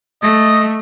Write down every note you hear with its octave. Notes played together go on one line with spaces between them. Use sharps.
A3 D#5